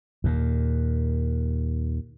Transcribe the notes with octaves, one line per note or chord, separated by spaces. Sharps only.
D#2 A#2